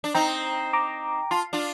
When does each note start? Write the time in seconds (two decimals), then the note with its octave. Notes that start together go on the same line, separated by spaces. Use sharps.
0.04 D4
0.14 C4 D#4 G5 A#5
0.73 A#5 D6
1.31 F4 A5 C6
1.53 D4 F4